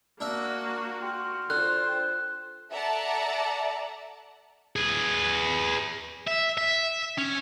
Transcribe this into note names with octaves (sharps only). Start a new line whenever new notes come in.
A#3 D4 F#4 E5
F#4 G5 C6 F6
D3 F4 C5 F#6
A4 D5 E5 F#5 A5 A#5
G#4 B4
E5
E5
C#4